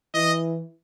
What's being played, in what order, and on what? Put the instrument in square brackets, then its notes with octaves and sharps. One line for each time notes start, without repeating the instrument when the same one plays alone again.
[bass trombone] E3 [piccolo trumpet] D#5